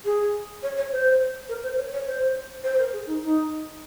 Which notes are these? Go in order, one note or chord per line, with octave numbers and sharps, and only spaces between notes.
G#4
C#5
C#5
C5
A#4
C5
C#5
C#5
C5
C5
A#4
G#4
D#4
D#4